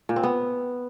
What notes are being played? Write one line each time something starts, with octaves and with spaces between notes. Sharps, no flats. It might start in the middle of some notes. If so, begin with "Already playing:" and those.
A#2
C4
B3